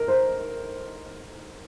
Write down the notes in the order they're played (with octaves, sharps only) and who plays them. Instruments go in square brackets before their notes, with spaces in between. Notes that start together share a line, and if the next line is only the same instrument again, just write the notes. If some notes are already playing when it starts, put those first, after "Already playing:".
Already playing: [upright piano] A#4
C5